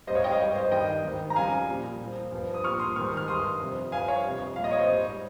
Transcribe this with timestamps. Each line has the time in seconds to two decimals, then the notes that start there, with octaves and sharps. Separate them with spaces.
0.07 G#2 G3 C5 D#5
0.15 C#5 F5
0.24 D#5 G5
0.32 C#5 F5
0.40 G2 G3
0.55 C5 D#5
0.71 G2 D#3 G3 D#5 G5
1.04 G#2 D#3 G3
1.30 A#5
1.35 F2 C#3 G3 F5 G#5
1.68 A#2 G3
2.00 A#2 F3
2.32 G2 F3
2.54 D#6
2.64 A#2 G3 C#6 F6
2.80 C6 D#6
2.96 G#2 D#3 G3 C#6 F6
3.17 F6
3.28 G2 D#3 G3 C6 D#6
3.60 F2 C3 G3
3.92 G2 F3 F5 G#5
4.08 C#5 F5
4.25 F2 C3 G3
4.56 A#2 G3 F5
4.64 D#5
4.71 C#5
4.79 C5 D#5
4.88 G#2 G3